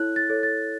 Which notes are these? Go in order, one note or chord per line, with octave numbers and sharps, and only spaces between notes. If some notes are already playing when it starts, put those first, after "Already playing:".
Already playing: E4 A4 C#5 F#6
A6
A4 C#5
A6